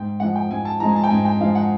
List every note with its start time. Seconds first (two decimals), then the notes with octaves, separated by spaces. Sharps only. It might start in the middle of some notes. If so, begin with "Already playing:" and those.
Already playing: G#2 G5
0.20 F3 G#3 F#5
0.36 G5
0.50 G#2 G#5
0.65 A5
0.80 F3 G#3 A#5
0.89 G#5
0.96 A5
1.04 G5
1.10 G#2 G#5
1.25 G5
1.41 F3 G#3 F5
1.55 F#5